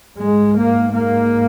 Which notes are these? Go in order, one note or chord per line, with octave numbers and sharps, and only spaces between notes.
G#2 G#3
A#3
A#3